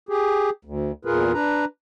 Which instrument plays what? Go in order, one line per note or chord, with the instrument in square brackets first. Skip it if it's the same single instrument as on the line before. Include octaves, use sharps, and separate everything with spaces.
[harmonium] G4 G#4
D2
E2 A#2 F4 G#4 A#4 B4
D4 B4 A#5